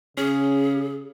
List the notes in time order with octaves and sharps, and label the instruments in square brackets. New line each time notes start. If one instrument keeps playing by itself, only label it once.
[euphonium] C#3 [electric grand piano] C#4 [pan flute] G#4